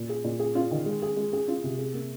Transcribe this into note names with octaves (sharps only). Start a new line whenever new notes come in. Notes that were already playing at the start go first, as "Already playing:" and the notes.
Already playing: A#2
G#4
A#2
G#4
F4
D#3
G#3
G#4
G#3
G#4
F4
C3
G#4
A#3